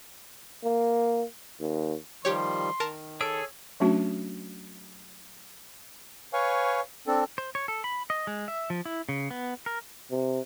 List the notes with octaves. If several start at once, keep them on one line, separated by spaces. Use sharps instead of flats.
A#3
D#2
D#3 F3 G3 G4 C#5 C6
D#3 A#4 A5
G#4 A4 C#5 E6 D7
F#3 A3 C#4 D4 F#4
B4 C#5 F5 G#5 C#6
C4 D4 A4
C5
C#5
A4
B5
D#5
G#3
E5
F3
E4
C#3
B3
A#4
C3